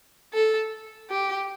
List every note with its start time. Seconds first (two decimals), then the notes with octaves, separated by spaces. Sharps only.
0.33 A4
1.10 G4